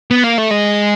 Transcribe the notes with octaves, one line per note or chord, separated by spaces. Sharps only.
B3
A#3
A3
G#3